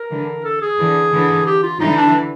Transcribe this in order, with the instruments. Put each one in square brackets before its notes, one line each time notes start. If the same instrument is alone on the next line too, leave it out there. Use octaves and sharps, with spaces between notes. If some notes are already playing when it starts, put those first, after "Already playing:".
Already playing: [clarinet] A#4
[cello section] D3 E3
[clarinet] A4
G#4
[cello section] D3 E3
D3 E3
[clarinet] G4
F4
[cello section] D3 E3 [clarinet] D#4
[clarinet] D4